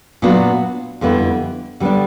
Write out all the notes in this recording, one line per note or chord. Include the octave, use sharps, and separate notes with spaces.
A#2 F#3 B3 D4 F#4
F2 D3 G3 B3 E4
D3 G3 B3 D4